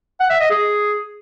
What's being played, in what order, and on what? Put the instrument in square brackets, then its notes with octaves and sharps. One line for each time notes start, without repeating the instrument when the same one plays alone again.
[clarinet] F#5
E5
D#5
G#4